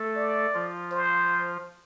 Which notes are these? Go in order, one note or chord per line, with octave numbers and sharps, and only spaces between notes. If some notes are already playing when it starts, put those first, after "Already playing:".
Already playing: A3 A4
D5
F3 F4
C5